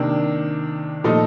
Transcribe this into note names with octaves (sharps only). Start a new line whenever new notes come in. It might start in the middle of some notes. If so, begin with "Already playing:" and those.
Already playing: C3 D#3 A#3 D4
A#2 F3 A3 D#4 A4